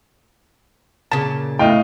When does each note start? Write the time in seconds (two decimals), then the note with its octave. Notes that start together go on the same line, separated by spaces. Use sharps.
1.11 A#2 C#3 A5
1.59 A2 A3 D#5 F5 G5